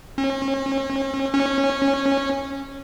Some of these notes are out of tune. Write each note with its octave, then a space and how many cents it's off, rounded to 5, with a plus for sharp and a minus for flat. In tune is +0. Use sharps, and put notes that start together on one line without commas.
C#4 -40
C#4 -15